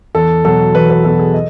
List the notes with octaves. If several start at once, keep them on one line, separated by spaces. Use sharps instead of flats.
E2 A4
B2 F#3 A4
E2 B4
B4
B2 F#3 A4
G#4
D#5